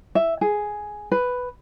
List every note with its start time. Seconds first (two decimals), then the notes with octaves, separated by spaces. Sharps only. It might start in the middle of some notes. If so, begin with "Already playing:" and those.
0.15 E5
0.41 G#4
1.12 B4